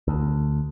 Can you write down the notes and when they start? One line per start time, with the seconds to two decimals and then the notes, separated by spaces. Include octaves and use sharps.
0.08 D2